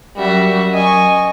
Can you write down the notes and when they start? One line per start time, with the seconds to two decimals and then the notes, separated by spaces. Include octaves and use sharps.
0.17 F#3 G3 C#4 F#4 A#4 E5
0.73 D#5 G#5 C#6